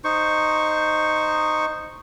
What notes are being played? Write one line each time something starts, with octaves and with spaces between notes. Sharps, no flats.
D#4 C5 C#6